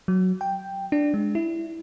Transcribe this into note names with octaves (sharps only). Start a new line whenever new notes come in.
F#3
G5
D4
G#3
E4